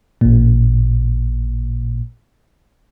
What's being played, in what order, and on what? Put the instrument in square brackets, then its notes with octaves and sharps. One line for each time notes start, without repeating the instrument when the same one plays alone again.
[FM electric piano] A1 A#2